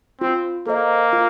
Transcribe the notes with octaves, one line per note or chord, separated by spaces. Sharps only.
C4 F4
A#3 A4 C5 D#5
F4